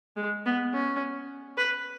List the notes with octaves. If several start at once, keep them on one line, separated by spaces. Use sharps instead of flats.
G#3
B3
C#4
B4